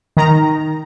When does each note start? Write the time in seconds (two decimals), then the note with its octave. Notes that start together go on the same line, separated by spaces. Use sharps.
0.17 D#3 A#5